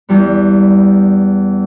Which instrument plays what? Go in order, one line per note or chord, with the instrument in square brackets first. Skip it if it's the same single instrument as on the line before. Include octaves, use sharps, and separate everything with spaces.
[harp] E2 G3 B3